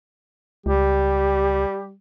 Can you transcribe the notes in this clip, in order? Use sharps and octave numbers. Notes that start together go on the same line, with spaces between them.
C#2 G3 G4